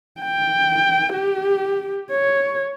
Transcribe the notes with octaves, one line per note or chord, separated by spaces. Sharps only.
G5
G4
C#5